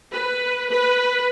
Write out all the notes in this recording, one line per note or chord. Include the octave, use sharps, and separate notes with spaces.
B4
B4